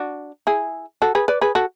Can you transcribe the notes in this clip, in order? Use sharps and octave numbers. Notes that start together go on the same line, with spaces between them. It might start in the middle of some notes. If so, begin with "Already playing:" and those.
Already playing: D4 F#4
E4 G#4
F#4 A4
G#4 B4
B4 D5
G#4 B4
F#4 A4